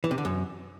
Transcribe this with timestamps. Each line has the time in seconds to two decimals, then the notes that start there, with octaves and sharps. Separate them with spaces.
0.04 E3
0.11 C3
0.18 D3
0.25 F#2